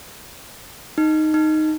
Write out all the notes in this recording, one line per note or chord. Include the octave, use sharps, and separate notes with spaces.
D#4
D#4